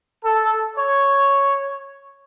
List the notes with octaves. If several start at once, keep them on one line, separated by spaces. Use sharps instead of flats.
A4
C#5